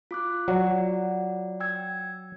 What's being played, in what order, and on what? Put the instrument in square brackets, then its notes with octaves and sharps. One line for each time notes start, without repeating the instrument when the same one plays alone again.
[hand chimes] F4 D6 F#6
[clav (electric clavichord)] F#3 [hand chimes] F4 D5 F#5
[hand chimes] G5 E6 G#6